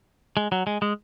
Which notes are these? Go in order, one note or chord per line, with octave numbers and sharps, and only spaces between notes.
G#3
F#3
G#3
G#3